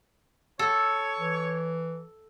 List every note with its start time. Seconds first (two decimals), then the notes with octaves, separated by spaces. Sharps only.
0.59 A4 C#5
1.19 E3